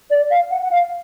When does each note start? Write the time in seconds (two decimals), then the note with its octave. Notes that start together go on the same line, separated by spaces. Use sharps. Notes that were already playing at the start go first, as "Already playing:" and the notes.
0.10 D5
0.30 F5
0.50 F#5
0.62 F#5
0.71 F5